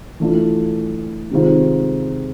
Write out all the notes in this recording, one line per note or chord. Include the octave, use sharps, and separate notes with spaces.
E3 A3 D4 F4
C3 D#3 G#3 C4 F4